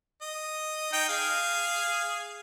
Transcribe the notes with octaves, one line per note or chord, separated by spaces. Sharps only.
D#5
D#4 G5
G#4 F5